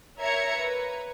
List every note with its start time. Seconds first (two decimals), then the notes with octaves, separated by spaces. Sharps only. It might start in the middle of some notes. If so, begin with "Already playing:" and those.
0.19 A#4 C#5 E5 A#5 G#6 C#7
0.57 B4